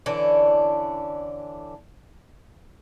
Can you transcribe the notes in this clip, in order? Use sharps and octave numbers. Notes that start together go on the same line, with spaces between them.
D3 E3 C#4 D4